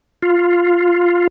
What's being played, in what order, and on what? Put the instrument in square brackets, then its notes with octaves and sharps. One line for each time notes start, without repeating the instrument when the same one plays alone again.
[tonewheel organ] F4